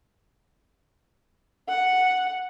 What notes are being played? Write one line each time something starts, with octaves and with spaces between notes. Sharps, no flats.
F#5